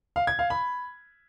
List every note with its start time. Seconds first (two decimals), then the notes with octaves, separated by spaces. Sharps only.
0.16 F5
0.27 G#6
0.39 F5
0.50 B5